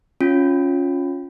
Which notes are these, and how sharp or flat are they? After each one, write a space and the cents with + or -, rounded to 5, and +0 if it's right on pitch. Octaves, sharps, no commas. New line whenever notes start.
C#4 +0 F4 +15